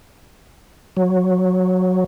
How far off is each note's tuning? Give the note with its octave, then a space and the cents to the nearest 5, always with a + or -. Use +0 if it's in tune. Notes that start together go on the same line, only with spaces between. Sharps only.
F#3 -10